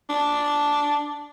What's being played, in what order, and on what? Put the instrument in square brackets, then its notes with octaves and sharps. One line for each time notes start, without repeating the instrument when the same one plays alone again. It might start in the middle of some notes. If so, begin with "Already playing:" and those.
[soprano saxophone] D4